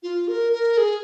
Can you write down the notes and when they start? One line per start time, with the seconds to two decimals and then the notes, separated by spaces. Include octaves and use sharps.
0.03 F4
0.28 A#4
0.53 A#4
0.78 G#4